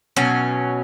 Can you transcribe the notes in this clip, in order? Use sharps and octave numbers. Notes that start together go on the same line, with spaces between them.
B2 F#3 C#4